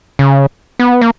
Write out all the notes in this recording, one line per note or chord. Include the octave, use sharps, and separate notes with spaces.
C#3
B3
A#3